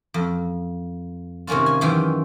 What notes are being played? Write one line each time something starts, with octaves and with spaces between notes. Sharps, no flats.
F2
C3 D#3 A#3 C#4 F4
G#5
F#2 D#3 E3 F4 G5